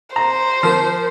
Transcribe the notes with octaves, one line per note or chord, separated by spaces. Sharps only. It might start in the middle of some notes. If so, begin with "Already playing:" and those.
C5 A#5
F3 A#4 C6